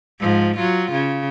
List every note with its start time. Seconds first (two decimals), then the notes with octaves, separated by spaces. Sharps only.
0.20 G#2 F3
0.57 F#3 F4
0.92 C#3